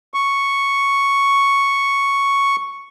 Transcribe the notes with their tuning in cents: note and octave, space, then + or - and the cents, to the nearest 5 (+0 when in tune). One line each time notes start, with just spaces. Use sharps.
C#6 +0